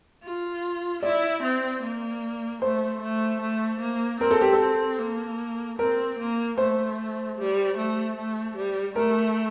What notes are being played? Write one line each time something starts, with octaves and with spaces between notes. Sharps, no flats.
F4
E4 D5
C4
A#3
A3 C5
A3
A3
A#3
C4 A#4
A4
G4
A4
C4
A#3
C4 A#4
A#3
A3 C5
G3
A3
A3
G3
A3 A#4